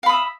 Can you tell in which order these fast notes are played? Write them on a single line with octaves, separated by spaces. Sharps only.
F5 B5 D#6 E5